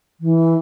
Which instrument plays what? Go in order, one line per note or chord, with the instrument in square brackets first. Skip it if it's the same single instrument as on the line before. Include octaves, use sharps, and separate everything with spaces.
[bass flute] E3